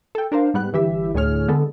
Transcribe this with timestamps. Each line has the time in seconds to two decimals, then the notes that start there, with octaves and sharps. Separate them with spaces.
0.15 A4 G5
0.32 D4 A#4 C5 F5
0.54 G#2 G3 B3 F#6
0.72 G1 E3 G4 E5
1.14 D2 A2 G#4 C#5 F6
1.48 D3 G#3 B3 A4